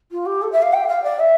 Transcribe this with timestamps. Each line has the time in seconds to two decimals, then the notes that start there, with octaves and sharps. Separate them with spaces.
0.11 F4
0.25 G4
0.42 A4
0.52 E5
0.62 F5
0.72 G5
0.88 F5
1.03 D5
1.19 E5